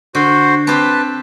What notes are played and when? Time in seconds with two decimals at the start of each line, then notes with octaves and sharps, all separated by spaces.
0.15 D3 F#4 C5
0.67 C4 G4 B4 A5